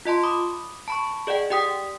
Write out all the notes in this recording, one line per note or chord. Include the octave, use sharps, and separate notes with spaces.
F4 D#5 A5 C6
B5 D6 D#6
A5 B5 C#6
G#4 D5 D#5 F#5 G5
G4 D5 G5 D#6 B6